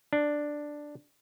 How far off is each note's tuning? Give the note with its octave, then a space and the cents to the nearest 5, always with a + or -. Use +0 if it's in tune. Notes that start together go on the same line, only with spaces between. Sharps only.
D4 +5